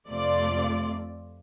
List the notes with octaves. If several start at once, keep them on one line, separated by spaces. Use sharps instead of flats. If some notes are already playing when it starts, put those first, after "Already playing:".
F2 C3 A3 F4 D5